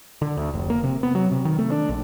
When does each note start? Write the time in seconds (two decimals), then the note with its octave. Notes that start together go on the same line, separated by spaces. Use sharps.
0.22 D3
0.37 D2
0.54 F1
0.70 A#3
0.84 C3
1.03 B3
1.15 F#3
1.32 C3
1.45 D#3
1.59 A3
1.72 D4
1.89 A#1